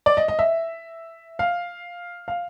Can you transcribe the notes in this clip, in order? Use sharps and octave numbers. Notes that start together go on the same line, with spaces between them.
D5
D#5
D#5
E5
F5
F5